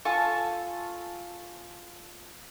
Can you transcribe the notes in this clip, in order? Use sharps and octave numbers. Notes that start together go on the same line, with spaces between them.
F4 A4 G#5 C#6